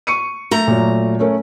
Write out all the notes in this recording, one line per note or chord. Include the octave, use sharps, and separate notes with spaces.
C#6 C#7 D#7
A3 A#5
A#2 F#3
A3 C#4 A#4